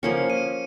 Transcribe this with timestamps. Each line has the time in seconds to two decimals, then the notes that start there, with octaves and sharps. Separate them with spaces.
0.03 F3 A#3 C#4 C#7
0.30 D#7